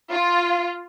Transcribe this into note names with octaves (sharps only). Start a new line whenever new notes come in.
F4